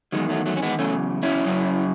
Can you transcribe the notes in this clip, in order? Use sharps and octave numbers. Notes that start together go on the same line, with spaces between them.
E2 D#3 F#3 G#3
F#3 A3
F#3 A3
C#4
G#3 B3
E2 C#3 F#3 A3 C#4
C#4 E4
F#2 C#3 F#3